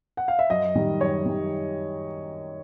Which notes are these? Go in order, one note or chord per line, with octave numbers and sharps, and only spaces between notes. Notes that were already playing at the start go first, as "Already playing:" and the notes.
F#5
F5
E5
F#2 D#5
D#3 G3
F#2 C#5
D#3 G3